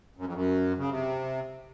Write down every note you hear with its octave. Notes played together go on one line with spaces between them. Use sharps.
F#2
F2
F#2
C#3
C3